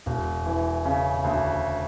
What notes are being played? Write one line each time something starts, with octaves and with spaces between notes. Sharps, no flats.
E1
E3
C#3
D2